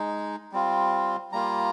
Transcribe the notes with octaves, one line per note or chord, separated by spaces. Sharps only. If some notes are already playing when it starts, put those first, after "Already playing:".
Already playing: G#3 D#4
G3 C4 F4
G3 A#3 F4 A#5